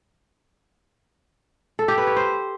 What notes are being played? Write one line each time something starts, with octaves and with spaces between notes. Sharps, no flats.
A4
G4
B4
C#5
C5